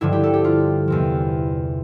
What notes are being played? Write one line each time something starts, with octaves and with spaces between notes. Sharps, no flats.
G2 D3 F3 E4
G4
A4
G4
F4
E2 C3 F3